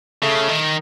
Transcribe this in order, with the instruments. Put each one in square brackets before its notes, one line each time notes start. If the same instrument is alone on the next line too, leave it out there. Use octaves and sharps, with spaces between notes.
[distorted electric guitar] C#3 [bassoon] A3
[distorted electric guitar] D#3